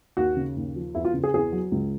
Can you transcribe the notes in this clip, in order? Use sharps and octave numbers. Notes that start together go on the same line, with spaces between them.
D#2 F#4
C#3
D#2
F3
E2 E4
F4
C#3
G#4
E2 G#4
F#3
C#2